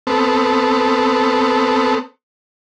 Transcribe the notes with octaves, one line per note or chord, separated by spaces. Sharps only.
B3 C4 A4